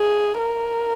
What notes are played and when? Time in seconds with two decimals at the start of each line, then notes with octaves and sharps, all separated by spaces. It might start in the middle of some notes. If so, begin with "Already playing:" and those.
Already playing: G#4
0.39 A#4